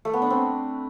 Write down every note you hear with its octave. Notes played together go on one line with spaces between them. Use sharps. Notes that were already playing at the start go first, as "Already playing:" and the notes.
A3
B3
D4
C4